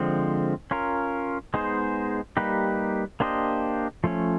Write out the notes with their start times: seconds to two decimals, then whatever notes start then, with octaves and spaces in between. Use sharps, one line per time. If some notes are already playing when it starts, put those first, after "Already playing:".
Already playing: D3 F3 G#3 C4
0.71 C#4 F4 A#4
1.54 G#3 B3 D#4 G#4 C5
2.37 G3 A#3 D#4 G4 B4
3.20 A#3 D4 G4 C5 D#5
4.04 F3 A3 C#4